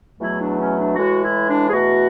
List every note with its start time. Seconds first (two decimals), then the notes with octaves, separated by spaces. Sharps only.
0.19 E2 B2 F#3 A3 E4
0.38 D4
0.58 C#4
0.76 D4
0.95 A2 E3 G#3 F#4
1.22 E4
1.47 D4
1.66 G#4
1.72 E2 B2 A3 F#4